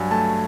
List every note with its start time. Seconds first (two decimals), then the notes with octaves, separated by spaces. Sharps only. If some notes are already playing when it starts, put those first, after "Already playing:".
Already playing: G2 F#3 G#5
0.11 A3 A5